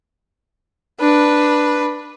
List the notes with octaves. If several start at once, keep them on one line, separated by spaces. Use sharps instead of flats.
D4 B4